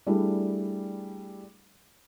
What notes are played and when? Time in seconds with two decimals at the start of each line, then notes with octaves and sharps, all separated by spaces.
0.07 G3 A3 D4 E4 G#4